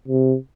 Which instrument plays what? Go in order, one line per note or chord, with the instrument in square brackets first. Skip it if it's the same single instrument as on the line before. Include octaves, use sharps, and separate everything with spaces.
[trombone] C3